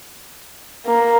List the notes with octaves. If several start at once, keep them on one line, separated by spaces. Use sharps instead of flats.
A#3